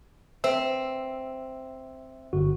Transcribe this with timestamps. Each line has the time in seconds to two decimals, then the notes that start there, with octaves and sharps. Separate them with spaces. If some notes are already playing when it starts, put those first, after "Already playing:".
0.44 C4 E5 E6
2.33 G1 F#4